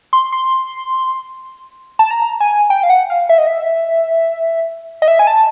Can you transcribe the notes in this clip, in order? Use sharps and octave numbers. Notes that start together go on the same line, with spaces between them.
C6
C6
A5
A#5
G#5
G5
F5
F#5
F5
E5
D#5
E5
D#5
E5
G#5
A5